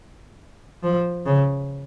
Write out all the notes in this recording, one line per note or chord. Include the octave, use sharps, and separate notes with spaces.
F3
C#3